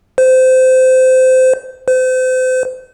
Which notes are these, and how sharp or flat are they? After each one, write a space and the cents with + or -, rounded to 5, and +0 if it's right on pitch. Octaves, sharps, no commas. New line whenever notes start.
C5 -20
C5 -35